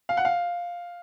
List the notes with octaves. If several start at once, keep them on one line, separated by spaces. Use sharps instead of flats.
F5
F#5
F5